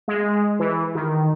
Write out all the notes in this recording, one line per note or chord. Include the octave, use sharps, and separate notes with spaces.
G#3
E3
D#3